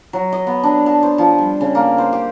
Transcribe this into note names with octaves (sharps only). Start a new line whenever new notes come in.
F#3
D#5
B3
D4
A5
C5
F3
G3
C#3
A#3
C5
G4